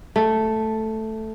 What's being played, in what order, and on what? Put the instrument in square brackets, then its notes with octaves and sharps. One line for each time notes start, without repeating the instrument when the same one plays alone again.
[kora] A3